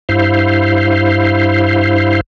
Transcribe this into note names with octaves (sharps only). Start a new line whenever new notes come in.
G2 E4 C5 F5